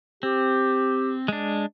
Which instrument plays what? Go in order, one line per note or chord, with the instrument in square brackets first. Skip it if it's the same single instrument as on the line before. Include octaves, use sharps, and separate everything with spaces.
[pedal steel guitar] C4 [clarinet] G4
[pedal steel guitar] G#3 D4